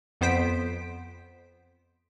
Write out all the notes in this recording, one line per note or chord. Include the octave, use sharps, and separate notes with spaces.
F2 B3 C5 B6 D7